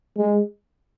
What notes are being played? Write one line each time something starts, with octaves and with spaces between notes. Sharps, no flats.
G#3